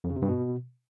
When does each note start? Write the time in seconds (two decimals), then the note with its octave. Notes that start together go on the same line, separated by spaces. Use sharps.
0.04 F2
0.10 C#3
0.16 C3
0.22 G2
0.28 B2